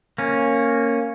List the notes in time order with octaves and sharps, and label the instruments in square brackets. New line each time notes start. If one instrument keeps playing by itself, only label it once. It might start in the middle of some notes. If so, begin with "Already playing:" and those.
[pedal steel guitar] A#3 C#4